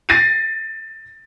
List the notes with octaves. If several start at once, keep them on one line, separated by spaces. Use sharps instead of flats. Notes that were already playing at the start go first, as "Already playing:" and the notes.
A6 A#6 C7 D7 D#7